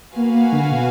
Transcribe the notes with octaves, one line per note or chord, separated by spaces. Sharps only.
A#3 F#4 B4 F5 G#5
A#3
D3
B2